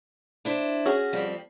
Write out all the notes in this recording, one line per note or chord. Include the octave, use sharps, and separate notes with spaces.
D4 E4 C5
C#4 F#4 G#4
F2 G3 C4